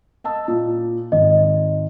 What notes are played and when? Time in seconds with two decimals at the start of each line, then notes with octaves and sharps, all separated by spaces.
0.24 D#5 A5 E6
0.48 A#2
1.12 G#1 D#5